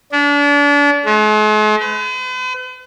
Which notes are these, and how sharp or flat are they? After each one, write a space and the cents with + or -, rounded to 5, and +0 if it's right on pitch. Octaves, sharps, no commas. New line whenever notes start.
D4 -35
G#3 +45
B4 +45